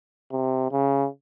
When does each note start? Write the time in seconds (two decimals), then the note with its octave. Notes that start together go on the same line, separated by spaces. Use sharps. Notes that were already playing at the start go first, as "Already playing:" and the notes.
0.32 C3
0.72 C#3